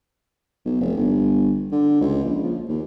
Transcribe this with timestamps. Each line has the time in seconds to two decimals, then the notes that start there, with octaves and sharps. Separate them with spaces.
0.66 B1
0.81 F1
0.97 G1
1.72 D3
2.01 C#2
2.24 A#1
2.43 F3
2.68 D#2